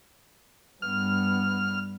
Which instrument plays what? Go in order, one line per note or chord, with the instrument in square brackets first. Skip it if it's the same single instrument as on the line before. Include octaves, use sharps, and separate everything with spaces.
[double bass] G2 B3 [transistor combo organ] F6